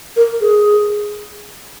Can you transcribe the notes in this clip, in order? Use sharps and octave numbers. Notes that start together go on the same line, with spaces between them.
A#4
G#4